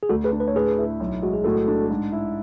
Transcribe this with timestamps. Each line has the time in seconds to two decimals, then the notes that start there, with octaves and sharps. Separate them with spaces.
0.03 G#4
0.09 D2 F#4 A4
0.24 G#4 B4
0.32 D4
0.40 B4
0.48 C#5
0.54 A2 G#4 B4
0.78 E4
1.00 B1
1.22 G#3 F#4
1.34 G#4
1.44 A2 F#4 A4
1.68 D4
1.91 G#2
2.12 E4